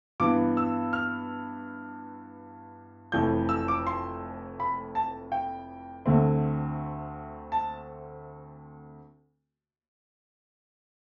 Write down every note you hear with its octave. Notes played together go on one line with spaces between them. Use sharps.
G2 E3 B3 D6
E6
F6
F1 F2 E3 A3 G6
E6
D6
C6
B5
A5
G5
D2 D3 A3 C4
A5